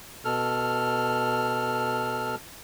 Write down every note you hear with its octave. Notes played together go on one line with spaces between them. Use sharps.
B2 A4 F6